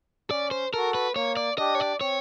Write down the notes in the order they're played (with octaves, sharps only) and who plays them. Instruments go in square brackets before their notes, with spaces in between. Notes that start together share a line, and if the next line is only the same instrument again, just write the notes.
[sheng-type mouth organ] C#4 [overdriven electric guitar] D5
[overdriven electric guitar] C5
[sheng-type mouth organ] F#4 A4 [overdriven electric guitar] A#4
[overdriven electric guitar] B4
[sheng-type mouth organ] A#3 [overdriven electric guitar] C#5
[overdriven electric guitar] D5
[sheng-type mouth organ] D4 G4 [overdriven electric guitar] D#5
[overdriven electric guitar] C#5
D5
[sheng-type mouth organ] C4 [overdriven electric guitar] C#5